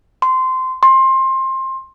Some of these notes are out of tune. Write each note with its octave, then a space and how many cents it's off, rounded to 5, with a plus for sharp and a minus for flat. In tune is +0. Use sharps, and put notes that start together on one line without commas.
C6 -15
C6 +20